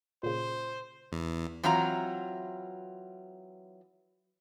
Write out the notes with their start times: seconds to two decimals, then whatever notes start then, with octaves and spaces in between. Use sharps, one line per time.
0.23 A#2 C#3 C5
1.12 E2
1.63 E3 F#3 C4 F4 A#5